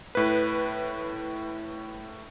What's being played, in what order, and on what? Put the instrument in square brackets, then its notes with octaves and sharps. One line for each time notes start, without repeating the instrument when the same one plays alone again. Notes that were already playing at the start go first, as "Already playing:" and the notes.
[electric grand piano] A2 B4